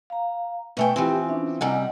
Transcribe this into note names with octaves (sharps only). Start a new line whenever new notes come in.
F5 A#5
B2 A3 B4 E5 G5 G#5
E3 F3 C4 G4 G5 G#5
C#4 D4 E5
F#2 C3 G3 D#5 F#5 G#5